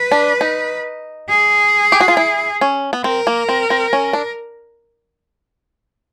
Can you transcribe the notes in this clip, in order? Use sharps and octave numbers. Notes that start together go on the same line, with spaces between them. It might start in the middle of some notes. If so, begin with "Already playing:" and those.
Already playing: B4
D4
D#4
G#4
G4
F#4
F4
E4
C#4
B3
C4 A#4
A#3
C4
C4
C#4
D4